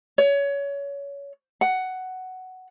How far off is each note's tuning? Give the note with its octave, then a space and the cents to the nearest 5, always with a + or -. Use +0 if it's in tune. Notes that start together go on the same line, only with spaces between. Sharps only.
C#5 +25
F#5 +10